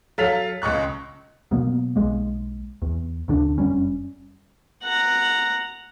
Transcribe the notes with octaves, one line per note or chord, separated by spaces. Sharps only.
F#3 A4 F5 A6 B6 F7
C#2 D#5 C#6 F#6
B2 F#3 A#3 B3
B1 G#3 A#3
E2
D2 D3 D4
F1 F#2 G3 C#4
F#5 A#5